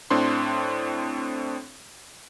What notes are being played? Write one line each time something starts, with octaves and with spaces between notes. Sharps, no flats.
A2 C4 D4 C6